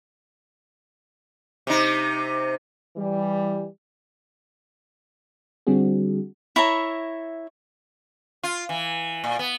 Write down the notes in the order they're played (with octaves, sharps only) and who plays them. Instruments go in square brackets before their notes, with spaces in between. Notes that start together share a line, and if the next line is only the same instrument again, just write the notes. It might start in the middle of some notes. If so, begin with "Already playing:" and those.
[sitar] C3 D#4
[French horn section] E3 G3
[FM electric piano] D3 G3 C4 D4 F#4 G#4
[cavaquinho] E4 C#5 E5 A#5
[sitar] F4
E3
A#2
B3